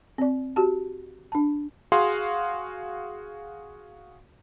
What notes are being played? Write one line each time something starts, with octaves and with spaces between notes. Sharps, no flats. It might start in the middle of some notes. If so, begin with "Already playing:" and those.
C4 D5
F#4 G4 A5
D4 A5
F#4 G#4 F5 C6